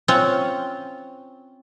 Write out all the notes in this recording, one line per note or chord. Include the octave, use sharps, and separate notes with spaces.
C4 C#4 F4 C#5 F#5